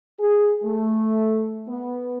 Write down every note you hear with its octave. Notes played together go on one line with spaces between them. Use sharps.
G#4
A3
B3